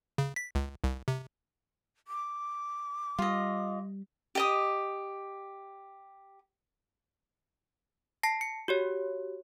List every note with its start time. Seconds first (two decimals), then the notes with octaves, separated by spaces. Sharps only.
0.18 C#3
0.36 B6
0.55 C#2
0.84 C2
1.08 C3
2.08 D6
3.19 G3 F4 D#5
4.35 G4 D#5 D#6
8.23 A5 A#6 C7
8.41 C#7
8.68 F#4 G4 C#5